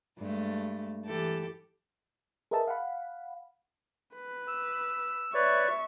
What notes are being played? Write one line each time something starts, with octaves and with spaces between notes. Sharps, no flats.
G2 G#3 A3
E3 G4 A4
G#4 A#4 B4 D#5 E5 A5
F5 F#5 B5
B4
E6
B4 C#5 D5 E5 C#6